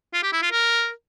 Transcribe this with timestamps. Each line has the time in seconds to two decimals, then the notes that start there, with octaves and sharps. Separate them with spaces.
0.13 F4
0.23 G4
0.33 E4
0.42 F4
0.52 A#4